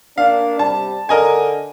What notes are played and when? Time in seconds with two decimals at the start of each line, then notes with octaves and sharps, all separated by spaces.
0.18 A#3 D4 F5
0.59 C3 G3 A5
1.09 D3 A#4 D#5 G#5